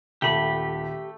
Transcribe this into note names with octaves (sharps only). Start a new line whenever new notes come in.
D#1 A3 G4 B5